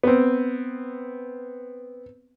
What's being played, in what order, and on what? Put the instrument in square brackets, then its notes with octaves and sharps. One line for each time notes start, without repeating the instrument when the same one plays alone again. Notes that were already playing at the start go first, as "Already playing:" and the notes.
[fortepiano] B3 C4